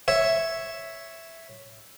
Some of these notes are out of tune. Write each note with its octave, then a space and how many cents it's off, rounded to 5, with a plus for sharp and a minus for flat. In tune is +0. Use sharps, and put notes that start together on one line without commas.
C#5 +0 E5 +0